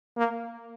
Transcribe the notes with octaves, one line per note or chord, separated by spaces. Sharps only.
A#3